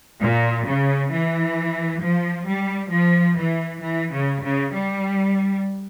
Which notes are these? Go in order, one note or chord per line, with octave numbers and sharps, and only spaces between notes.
A#2
C#3
E3
F3
G3
F3
E3
E3
C#3
C#3
G3